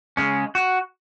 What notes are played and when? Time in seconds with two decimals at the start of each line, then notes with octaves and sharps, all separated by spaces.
0.17 C#3 G#3 C#4
0.55 F#4